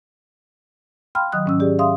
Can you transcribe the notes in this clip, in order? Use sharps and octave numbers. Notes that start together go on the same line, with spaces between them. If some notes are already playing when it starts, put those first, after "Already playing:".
F5 G5 B5 C6 F6
D#3 F#3 D#5 D#6 F#6
G#2 C#4 E6
G4 G#4 D5
E5 F5 C6 D#6